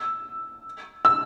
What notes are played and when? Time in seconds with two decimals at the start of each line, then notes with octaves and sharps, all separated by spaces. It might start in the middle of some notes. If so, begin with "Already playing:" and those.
Already playing: E6
1.05 E6